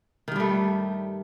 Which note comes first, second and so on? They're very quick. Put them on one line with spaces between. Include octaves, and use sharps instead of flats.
D#3 G2 G3 A3